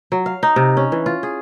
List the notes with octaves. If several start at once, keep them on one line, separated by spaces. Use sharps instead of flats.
F#3
F5
D#4
C3
C#4
E3
F4
G#4